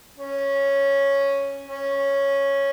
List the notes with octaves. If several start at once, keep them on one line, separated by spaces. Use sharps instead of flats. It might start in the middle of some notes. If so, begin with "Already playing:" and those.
C#4
C#4